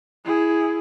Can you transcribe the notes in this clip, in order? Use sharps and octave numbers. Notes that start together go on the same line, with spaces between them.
E4 G#4